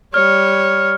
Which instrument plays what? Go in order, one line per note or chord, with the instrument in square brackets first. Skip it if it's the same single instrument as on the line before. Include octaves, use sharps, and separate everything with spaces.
[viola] G3 C#5 [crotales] F6